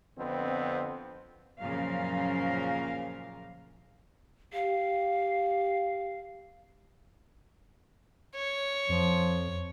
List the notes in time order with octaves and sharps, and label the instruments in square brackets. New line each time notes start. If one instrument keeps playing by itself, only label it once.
[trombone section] F2 D3 B3 C4
[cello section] F#2 A#2 C#3 F3 A#4 F5
[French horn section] G4 [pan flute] F5
[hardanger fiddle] C#5
[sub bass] F2 [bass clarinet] F3